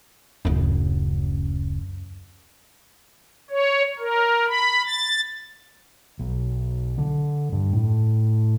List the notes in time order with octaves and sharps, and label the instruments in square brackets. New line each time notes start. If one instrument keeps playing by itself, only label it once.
[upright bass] D1 C#3 [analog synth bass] F#2
[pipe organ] C#5
A#4
B5
A6
[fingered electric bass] B1
D3
G2
A2